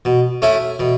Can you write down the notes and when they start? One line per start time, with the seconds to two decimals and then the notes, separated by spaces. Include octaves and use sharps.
0.05 B2
0.42 A3 C#4 E4
0.79 B2